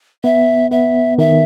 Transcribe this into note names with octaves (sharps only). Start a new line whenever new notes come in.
B3 E5
B3 E5
D#3 E5